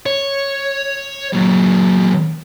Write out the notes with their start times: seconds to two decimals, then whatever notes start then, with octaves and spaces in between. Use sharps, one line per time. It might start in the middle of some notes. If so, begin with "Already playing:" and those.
0.06 C#5
1.33 A#2 F#3